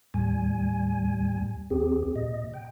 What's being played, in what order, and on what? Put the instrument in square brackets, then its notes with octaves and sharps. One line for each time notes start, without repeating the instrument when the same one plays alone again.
[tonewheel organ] D#2 A2 G3 G#5
D#2 C4 G4 G#4
A#2 D#5
G5